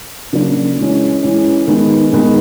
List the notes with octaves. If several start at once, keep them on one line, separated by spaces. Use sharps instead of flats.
C#3 F#3 A#3 D4
E3 G#3 C#4
E3 G#3 C#4
D#3 G#3 B3
D#3 G#3 B3